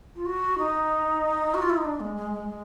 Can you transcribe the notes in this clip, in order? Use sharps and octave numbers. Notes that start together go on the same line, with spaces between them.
F4
F#4
D#4
F#4
F4
E4
D#4
D4
G#3
G#3
G#3
G#3